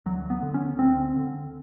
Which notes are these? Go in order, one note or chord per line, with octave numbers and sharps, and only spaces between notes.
D2 F#3
B3
D3
C#4
D2 C4
D3